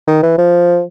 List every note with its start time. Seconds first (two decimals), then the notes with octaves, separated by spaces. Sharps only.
0.07 D#3
0.23 E3
0.38 F3